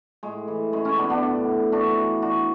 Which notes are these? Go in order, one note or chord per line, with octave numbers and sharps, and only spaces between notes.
A2 G#3
E3
F#2 G#3
C#4 E4
D3 B3 D4
B3 D4
A2
E3
E3 D4 F#4
E3
E3 D4 F#4